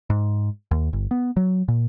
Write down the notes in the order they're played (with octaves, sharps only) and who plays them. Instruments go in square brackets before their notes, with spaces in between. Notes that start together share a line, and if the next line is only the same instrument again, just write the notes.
[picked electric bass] G#2
D#2
G1
B3
F#3
A#2